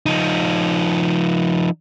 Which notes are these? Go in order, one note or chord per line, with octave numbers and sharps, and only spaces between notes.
F3 D#4